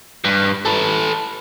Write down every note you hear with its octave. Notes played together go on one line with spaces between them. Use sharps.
G2
A4 B4